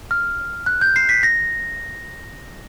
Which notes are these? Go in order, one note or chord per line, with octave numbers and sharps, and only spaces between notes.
F6
F#6
G6
C7
B6
A#6